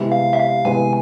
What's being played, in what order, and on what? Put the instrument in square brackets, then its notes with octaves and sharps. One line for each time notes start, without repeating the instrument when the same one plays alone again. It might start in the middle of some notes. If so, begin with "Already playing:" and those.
Already playing: [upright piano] C3 G#3 B3 E4
[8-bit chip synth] F5
E5
F5
[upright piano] C3 G#3 B3 E4 [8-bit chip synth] G#5